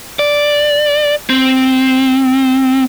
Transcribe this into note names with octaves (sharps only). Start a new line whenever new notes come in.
D5
C4